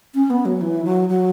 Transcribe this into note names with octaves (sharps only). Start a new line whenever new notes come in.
C#4
B3
F#3
E3
F#3
F#3